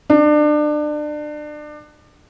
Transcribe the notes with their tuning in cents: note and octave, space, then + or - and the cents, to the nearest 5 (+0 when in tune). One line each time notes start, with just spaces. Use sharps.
D4 +30